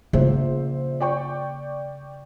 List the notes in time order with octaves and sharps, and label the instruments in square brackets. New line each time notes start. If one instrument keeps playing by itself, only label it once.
[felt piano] A#1 C5 E5 [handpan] C#3 [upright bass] A#3
[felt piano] D5 G5 C#6